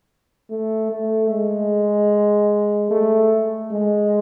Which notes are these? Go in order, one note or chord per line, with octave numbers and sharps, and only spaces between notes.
A3
A3
G#3
A3
G#3